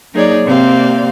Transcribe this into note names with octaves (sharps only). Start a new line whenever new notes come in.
F#3 A#3 D#4 G#4 C#5 D5
C3 A#3 C4 D5 F5